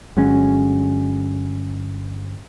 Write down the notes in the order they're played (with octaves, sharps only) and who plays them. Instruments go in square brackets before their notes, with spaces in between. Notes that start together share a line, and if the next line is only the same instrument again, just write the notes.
[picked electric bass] G1 F#3 G#3 C#4